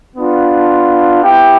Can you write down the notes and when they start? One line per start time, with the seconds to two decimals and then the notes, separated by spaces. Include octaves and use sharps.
0.16 B3 D4 F4
1.22 B3 E4 G4 G5